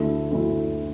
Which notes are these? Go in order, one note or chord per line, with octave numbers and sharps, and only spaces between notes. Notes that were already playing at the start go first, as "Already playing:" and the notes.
Already playing: D2 D3 A3 E4
D2 D3 A3 E4